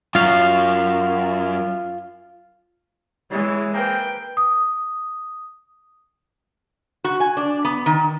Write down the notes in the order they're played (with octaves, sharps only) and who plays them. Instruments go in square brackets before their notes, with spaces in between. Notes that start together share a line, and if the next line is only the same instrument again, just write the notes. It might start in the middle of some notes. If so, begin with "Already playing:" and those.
[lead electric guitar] F#2 [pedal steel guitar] F4 F5
[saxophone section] E3 [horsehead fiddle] G#3 C#5
[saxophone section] A#3 C4 G#4 [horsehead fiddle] B4 [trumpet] G5
[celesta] D#6
[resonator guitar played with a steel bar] F#4
G#5
D4
B3
D#3